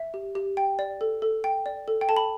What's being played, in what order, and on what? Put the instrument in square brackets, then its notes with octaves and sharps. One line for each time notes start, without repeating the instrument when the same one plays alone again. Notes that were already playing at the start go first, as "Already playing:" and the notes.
Already playing: [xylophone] E5
G4
G4
G5
D5
A4
A4
G5
D5
A4
G5
A4 A5
B5